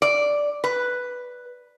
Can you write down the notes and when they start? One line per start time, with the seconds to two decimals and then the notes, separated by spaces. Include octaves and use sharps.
0.02 D5
0.64 B4